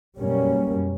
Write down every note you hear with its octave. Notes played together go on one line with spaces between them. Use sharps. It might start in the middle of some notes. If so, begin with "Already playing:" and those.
F#2 B2 G3 A#3 C#4